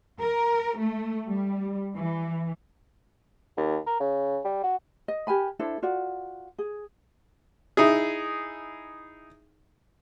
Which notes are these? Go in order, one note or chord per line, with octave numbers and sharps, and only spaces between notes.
A#4
A3
G3
E3
D#2
A#4
C#3
G3
F#4
D#5
G4 A#4 G#5 B5
D4 E4 A4 C5
F4 F#4 D5
G#4
D#4 E4 G#4